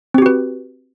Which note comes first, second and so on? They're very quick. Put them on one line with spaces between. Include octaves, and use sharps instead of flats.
C4 G4 F#4 B4